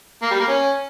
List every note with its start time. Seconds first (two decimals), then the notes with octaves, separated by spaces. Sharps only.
0.22 A#3
0.31 G3
0.39 A#3
0.48 C#4